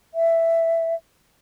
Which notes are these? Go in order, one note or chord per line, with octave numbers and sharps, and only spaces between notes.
E5